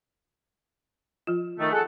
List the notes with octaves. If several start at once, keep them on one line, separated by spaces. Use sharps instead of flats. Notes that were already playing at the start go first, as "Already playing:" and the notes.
F3 F4
D#3 A3
G#4 A4 F#5